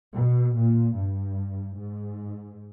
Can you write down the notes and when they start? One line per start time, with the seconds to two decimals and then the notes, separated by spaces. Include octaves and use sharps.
0.13 B2
0.54 A#2
0.94 G2
1.75 G#2